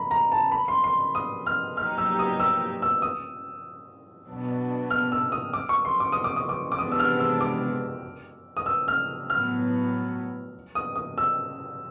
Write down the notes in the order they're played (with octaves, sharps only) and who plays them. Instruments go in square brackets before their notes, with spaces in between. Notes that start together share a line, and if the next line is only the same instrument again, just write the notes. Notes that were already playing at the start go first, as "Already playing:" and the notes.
Already playing: [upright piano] A#5 B5
A#5
A5
B5
C6
C6
D#6
F6
[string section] F#3 A#3 D#4 G4 [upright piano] F6
[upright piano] E6
D#6
E6
E6
D#6
[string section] B2 F#3 B3 D4
[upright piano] F6
E6
D#6
D6
C#6
C6
D6
D#6
D6
D#6
D6
D6
[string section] C3 E3 G#3 B3 D4 [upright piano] D#6
[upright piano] E6
F6
E6
D6
D#6
E6
F6
[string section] A2 F#3 B3 [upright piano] F6
[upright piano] D#6
D#6
E6